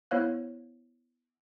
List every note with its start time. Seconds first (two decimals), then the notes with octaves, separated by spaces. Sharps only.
0.11 B3 E4 C5 C#5 F5 F#6